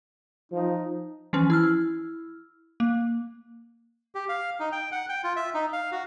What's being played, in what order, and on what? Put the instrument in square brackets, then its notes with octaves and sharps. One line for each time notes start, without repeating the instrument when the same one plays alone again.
[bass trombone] F3 [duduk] D#4
[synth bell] E3 F3 C#4
E4 E6 F6
A#3
[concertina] G4
F5
D#4
G5
F#5
G5
F4
E5
D#4
F5
F#4